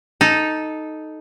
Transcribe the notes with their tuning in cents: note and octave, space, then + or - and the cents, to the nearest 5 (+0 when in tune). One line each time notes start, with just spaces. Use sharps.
D#4 +0 A4 -10